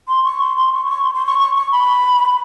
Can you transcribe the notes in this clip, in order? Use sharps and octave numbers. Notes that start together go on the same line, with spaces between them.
C6
C#6
C6
C6
C#6
C6
C#6
C6
C6
C#6
C#6
C#6
B5